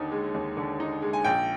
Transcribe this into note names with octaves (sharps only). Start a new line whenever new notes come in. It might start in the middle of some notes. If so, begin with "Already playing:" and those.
Already playing: D#2 D3 D#4
G#3
D#2
D3
D#4
G#3
G#5
A#1 G5